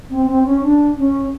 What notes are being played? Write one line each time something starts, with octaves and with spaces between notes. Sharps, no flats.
C4
C4
C#4
D4
C#4